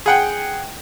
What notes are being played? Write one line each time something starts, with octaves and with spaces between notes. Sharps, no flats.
G#4 F#5 G5